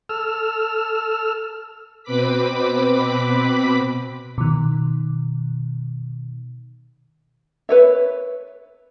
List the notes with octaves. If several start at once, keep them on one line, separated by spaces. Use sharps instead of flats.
A4 E6 F6
B2 C4 B4 B5 D6 B6
B2 D#3
B4 C#5 E5